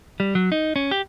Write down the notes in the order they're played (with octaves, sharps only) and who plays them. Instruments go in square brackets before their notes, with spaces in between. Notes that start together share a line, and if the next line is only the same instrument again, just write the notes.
[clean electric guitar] G3
F#3
D#4
C#4
G4